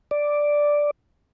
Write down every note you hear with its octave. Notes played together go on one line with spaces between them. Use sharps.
D5